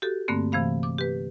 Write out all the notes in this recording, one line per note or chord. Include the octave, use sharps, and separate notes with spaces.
F#4 G4 A4
G2 D3 A3 A#3 C4
C3 E3 A3 F5 B5
D6
G4 B4